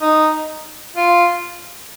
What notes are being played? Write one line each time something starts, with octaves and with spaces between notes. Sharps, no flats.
D#4
F4